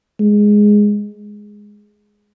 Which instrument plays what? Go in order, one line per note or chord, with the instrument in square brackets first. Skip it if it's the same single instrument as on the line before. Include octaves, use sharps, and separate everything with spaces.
[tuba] G#3